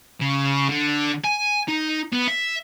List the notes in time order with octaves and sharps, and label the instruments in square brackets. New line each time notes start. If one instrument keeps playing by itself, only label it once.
[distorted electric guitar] C#3
D3
G#5
D#4
B3
E5